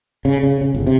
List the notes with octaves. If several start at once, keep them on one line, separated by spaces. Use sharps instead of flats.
C#3
C#3
C#3
G1
C3